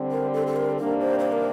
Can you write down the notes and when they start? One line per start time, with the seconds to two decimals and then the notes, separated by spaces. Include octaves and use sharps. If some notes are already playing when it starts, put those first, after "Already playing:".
Already playing: D3 G3 C4
0.11 A#4
0.34 A4
0.47 A4
0.56 A#4
0.78 C3 D#3 G3 A#3 D4 A#4
1.01 C5
1.19 C5
1.32 A#4